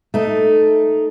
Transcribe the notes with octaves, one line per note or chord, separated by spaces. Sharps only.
A3 D#4